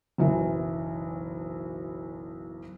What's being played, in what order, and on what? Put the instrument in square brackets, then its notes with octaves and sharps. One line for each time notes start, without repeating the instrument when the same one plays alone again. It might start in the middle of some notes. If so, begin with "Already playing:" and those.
[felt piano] F#1 B1 E3